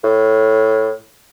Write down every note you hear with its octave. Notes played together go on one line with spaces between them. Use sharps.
A2